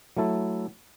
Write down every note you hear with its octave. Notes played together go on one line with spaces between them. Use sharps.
F#3 A3 E4 A4